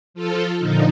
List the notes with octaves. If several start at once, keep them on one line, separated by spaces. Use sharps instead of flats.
F3 F4 A4
A#2 D3 F3 D#4